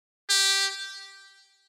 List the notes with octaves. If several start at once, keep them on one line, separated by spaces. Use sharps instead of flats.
G4